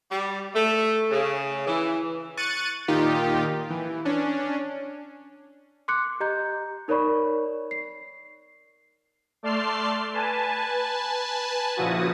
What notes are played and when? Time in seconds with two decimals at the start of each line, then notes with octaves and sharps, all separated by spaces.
0.11 G3
0.54 A3
1.11 C#3
1.67 E3
2.37 C#6 F#6 A6 C#7 D#7
2.88 A#2 D#3 D#4 F4 G4
3.70 E3
4.05 C#4 D4
5.88 C6 D6 F#6 C#7
6.20 G4 D#5 A#5 G6
6.88 D#4 A#4 C#5 D5 B5 C#6
7.71 C7
9.43 A3 D5 A5 C6 F6 C7
10.14 B4 G#5 A5
11.76 A#2 C#3 F3 E4 F#4 D#6